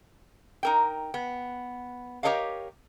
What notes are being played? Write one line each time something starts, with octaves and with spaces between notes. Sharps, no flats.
D#4 A#4 G5
B3
G4 A4 A#4 C#5 D#5 F5